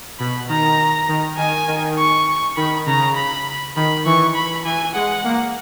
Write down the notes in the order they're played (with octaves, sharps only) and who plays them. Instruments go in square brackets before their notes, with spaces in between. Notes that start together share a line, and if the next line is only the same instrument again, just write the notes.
[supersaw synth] B2 [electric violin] B5
[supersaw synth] D#3 [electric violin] A#5
[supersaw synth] D#3
[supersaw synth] D#3 [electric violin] G#5
[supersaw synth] D#3
[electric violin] C#6
[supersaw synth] D#3 [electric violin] B5
[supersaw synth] C#3 [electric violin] A#5
[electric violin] B5
[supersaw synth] D#3 [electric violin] B5
[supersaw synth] E3 [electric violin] C#6
[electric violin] B5
[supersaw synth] E3 [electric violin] G#5
[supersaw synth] G#3 [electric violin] F#5
[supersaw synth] A#3